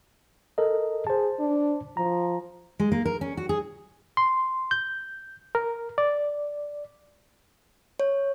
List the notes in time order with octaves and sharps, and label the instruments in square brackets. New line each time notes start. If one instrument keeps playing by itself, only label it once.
[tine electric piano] A4 A#4 D#5
[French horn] G#4 [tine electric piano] C5 A5
[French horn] D4
[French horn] F3 [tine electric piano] A#5
[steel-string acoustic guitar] G#3
A#3
A#4
C#4
F#4
G#4
[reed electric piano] C6
G6
A#4
D5
[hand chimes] C#5